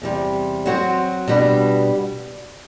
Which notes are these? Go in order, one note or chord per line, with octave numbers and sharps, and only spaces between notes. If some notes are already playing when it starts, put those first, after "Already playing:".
E2 C3 G3
F#3 C4 F#4 C5
B2 G3 B3 D4